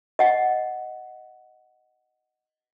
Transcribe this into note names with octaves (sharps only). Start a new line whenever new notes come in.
D#5 F#5